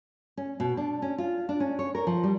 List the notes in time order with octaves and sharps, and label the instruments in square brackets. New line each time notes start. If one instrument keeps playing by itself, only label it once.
[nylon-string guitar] C#4
B2
D4
C#4
F4
D4
C#4
C#5
A#4
F3
G3